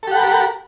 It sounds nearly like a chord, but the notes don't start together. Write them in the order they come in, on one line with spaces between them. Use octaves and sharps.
A4 G4 F#5 B5 A#4